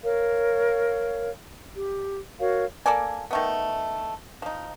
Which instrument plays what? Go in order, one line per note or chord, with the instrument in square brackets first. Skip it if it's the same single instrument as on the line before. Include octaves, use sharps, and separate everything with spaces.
[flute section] A#4 C#5 F5
G4
F#4 A#4 C#5 F5
[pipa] A#3 A4 D5 G#5
D#3 A3 B3
F3 D#4